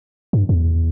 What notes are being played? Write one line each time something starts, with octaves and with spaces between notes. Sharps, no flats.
G2
E2